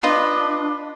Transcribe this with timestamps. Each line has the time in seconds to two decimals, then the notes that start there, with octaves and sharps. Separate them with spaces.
0.03 D4 F4 B4 D#5